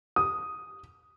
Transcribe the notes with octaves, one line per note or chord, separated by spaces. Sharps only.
D#6